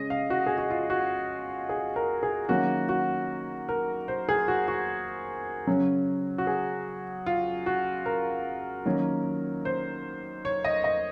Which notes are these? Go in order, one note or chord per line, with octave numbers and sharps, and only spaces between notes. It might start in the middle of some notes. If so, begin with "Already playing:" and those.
Already playing: C#3 G#3 C#4 D#5
F5
F#4
G#4
F#4
F4
F#4
G#4
A#4
G#4
D#3 F#3 A#3 C#4 F#4
F#4
A#4
C5
G#4
F#4
F#4
C#3 F#3 C#4
F#4
G#4
F4
F#4
A#4
D#3 F#3 A#3 C#4
C5
C#5
D#5
D#5